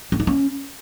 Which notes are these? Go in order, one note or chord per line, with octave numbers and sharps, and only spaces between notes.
C#4
D#4
C#4